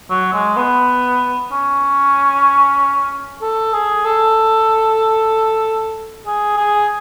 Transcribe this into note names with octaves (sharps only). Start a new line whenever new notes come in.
F#3
G#3
B3
C#4
A4
G#4
A4
G#4
G#4